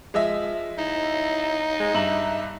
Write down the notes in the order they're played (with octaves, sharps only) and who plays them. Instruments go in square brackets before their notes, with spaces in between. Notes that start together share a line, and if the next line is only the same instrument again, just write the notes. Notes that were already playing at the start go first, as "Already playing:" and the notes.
[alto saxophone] F3 [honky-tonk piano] G#3 D#5 E5
[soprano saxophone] D#4 [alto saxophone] E4
[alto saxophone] G#3
[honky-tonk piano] G2 A#5 F#7 [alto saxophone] E5